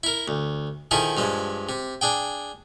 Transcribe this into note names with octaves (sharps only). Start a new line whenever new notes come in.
E4 A#4
D2
D#3 F3 E4 G#4 A4
G2 F3 G#3
C3
D4 G#4 G5